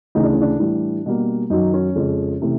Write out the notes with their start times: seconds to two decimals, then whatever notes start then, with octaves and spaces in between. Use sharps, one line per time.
0.15 D2 C#3 E3 A3 D#4
0.24 D4
0.33 C#4
0.41 D4
0.60 A2 E3 G3 D4
1.06 B2 G3 A#3
1.50 F#2 D#3 F#3 D#4
1.74 C#4
1.96 F2 C#3 F3 G#3
2.41 C3 E3 A3